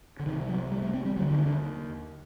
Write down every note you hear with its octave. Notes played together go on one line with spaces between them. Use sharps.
D3
C2 C3 D#3
F#3
G3
A3
C4
G3
D#2 D3 F#3
D#3
D3